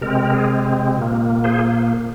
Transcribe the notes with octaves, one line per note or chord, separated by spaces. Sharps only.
C3 G#3 C4 A#4
A#4
G#4
A#2 A#3
G#4 C5